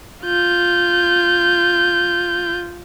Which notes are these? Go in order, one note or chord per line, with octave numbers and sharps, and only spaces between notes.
F4 G6